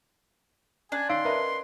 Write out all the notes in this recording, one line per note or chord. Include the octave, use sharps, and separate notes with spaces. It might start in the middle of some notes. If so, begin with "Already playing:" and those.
C#4 D4 G#5
D#3 C#5 F5 C6 E6 D7
A#4 B4 D#5 E5